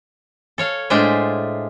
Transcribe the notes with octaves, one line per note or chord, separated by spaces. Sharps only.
A4 C#5 F5
A2 G#3 D4 F4 C5 E5